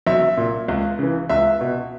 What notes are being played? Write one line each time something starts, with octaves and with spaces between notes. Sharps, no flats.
B1 E5
A#2
C#2
C#3 E3
C#2 E5
B2